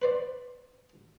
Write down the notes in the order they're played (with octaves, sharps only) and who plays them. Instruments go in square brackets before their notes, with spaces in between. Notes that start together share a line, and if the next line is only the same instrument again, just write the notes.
[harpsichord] B4 C5 D5